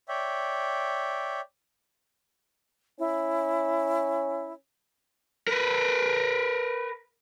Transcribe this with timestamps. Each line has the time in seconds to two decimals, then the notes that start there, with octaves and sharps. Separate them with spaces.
0.09 C#5 D5 E5 G5
2.99 C#4 E4
5.47 A#4 B4